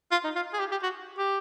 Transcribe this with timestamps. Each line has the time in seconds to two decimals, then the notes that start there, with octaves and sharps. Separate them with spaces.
0.12 F4
0.24 D#4
0.36 F4
0.53 G#4
0.60 G4
0.71 G4
0.83 F#4
1.18 G4